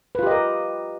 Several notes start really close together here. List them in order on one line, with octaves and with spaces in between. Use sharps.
B4 F4 G4 D#5 A#4